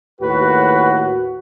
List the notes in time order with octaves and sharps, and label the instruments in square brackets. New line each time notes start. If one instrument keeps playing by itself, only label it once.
[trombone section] D#2 A2 F#4 [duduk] B4